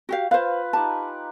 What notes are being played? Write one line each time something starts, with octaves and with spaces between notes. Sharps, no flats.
F#4 G4 F5
F4 B4 C5 F5
D#4 G4 G#5 A5